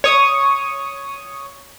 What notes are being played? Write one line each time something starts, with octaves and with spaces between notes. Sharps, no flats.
C#5 C#6 D#6